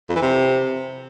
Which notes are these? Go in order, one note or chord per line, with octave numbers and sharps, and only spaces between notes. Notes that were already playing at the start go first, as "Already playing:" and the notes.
F2
E3
C3